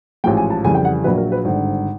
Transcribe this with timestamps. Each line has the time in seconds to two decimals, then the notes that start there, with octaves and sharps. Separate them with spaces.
0.24 A1 G#2 F3 G#3 G5
0.37 G#5
0.50 A5
0.64 F2 C#3 E3 G3 G#5
0.75 G5
0.85 F#5
1.04 A#1 A#2 F#3 B4
1.18 A#4
1.32 B4
1.45 G#1 G2 D3 C5